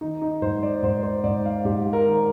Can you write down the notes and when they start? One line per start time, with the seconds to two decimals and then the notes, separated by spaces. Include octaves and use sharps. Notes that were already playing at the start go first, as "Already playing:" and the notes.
0.01 D#3 D#4
0.21 D#4
0.42 G#2 C5
0.63 D5
0.83 G#2 C5
1.03 C5
1.24 G#2 D5
1.45 F5
1.65 G#2 G4
1.93 A#4
2.05 D#3